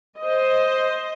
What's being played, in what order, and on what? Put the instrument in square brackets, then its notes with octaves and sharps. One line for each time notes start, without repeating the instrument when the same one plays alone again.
[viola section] C5 D#5